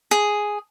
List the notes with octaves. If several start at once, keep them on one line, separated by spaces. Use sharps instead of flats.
G#4